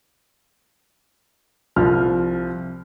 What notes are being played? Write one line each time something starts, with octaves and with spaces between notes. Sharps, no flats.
C2 F3 F6